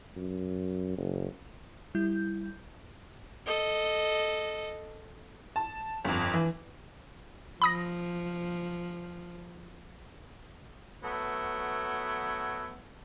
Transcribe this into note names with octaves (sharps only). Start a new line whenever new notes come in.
F#2
F#1
G3 E4 G6
A4 D#5
A5
G1 F2
E3
F3 B5 D#6 A#6
F#3 A3 B3 B4